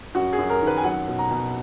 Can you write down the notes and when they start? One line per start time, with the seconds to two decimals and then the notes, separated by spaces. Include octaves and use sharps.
0.15 F#2 F#4
0.33 G#4
0.39 F#2
0.50 A#4
0.62 D#3
0.67 B4
0.78 G#5
0.84 F#3 F#5
1.08 B2
1.19 A#5
1.31 B2